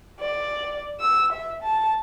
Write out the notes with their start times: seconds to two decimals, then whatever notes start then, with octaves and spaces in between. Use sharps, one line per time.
0.20 D5
1.00 E6
1.32 E5
1.63 A5